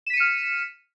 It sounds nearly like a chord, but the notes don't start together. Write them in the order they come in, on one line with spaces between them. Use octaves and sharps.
E7 B6 D#7 C#7 F6